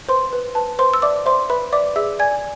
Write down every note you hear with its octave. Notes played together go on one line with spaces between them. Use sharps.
B4 C5 C6
B4
B4 A5
B4 C5 C6
E6
D5 E5 D6
C5 E5 C6
B4 E5 B5
D5 E5 D6
G#4 E5 E6
D5 G#5 G#6